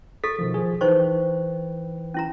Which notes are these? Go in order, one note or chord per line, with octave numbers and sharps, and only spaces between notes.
A4 C#6 A6 B6
B2 D#3 F3
F3 G#4
E3 D#4 B4 C5 G5 C#6
C#4 E4 A#5